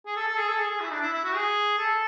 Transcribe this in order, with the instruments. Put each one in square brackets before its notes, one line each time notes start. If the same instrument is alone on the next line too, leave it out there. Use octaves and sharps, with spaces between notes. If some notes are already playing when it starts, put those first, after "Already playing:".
[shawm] G#4
A4
A4
G#4
A4
G#4
G#4
E4
D4
E4
E4
F#4
G#4
A4